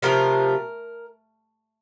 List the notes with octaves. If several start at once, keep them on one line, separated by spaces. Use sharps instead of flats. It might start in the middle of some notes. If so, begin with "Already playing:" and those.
C3 F3 A3 A#4